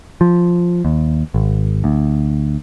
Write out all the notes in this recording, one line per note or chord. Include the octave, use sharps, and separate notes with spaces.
F3
D#2
G#1
D2